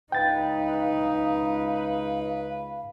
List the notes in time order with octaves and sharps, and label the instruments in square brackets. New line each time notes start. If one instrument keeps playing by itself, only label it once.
[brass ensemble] C#2 B4 [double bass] D#4 [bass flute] F5 [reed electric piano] G5 A6